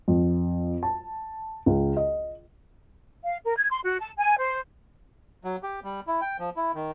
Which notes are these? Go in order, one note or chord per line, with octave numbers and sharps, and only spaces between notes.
F2
A5
C#2
D#5
F5
A#4
G#6
C6
F#4
A5
G#5
C5
F#3
G4
G3
E4
G5
F3
E4
D#3